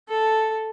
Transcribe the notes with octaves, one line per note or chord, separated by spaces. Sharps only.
A4